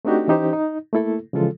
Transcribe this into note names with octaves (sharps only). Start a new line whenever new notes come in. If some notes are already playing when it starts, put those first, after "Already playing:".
A3 C4 D4 D#4 F#4 G4
E3 C#4 D#4 G4 C5
D#4
A3 A#3 E4 A4
C#3 E3 F3 G#3 F4 A4